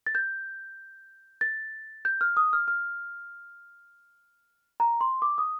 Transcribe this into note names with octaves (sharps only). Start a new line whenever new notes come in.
A6
G6
A6
G6
F6
D#6
F6
F6
A#5
C6
D6
D#6